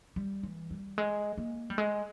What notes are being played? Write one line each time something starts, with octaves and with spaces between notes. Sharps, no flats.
G3
E3
G3
G#3
A#3
G3
G#3